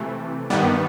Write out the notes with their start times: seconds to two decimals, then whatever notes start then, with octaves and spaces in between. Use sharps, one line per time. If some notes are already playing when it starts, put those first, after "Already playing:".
Already playing: C3 E3 A3
0.50 G2 D#3 G3 B3